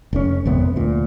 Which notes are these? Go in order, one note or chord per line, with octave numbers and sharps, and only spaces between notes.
F1 C#4
G#1 F2 C3 B3
D2 A#2